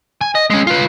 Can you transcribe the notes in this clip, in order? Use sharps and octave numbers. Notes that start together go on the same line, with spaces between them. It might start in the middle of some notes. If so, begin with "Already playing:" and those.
G#5
D#5
G#3 C#4
F4 B4